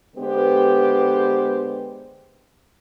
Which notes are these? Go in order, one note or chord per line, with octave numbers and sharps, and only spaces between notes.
D3 G#3 B3 G4 B4 C5